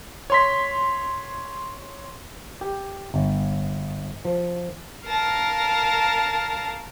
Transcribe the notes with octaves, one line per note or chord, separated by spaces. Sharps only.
C#5 C6 B6
G4
G1
F3
A#4 F5 A5 A#6